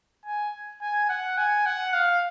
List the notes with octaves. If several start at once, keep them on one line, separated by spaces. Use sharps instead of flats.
G#5
G#5
F#5
G#5
F#5
F5